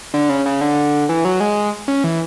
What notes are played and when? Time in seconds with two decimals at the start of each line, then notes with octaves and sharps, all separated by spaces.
0.14 D3
0.29 C#3
0.46 C#3
0.61 D3
1.09 E3
1.25 F#3
1.40 G#3
1.88 C#4
2.04 E3